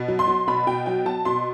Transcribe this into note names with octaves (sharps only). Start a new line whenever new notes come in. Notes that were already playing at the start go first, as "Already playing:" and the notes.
Already playing: B2
F#3
C6
F#3
B2 B5
B2 G5
F#3 G5
F#3 A5
B2 C6